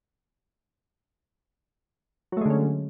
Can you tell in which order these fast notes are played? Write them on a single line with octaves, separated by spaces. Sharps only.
F#3 A3 G#3 D3 C#4